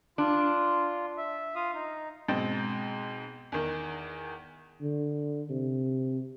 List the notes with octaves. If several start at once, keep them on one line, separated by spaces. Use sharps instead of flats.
D4 F4
E5
F4 F5 D#6
D#4
G#2 B2 C4 D#5 G5 A6
E2 D#3
D3
C3